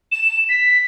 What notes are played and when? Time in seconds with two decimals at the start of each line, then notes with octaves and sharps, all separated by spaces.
0.12 E7
0.49 B6